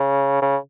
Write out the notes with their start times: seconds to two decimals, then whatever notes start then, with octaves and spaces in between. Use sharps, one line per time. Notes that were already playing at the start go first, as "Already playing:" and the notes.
Already playing: C#3
0.42 C#3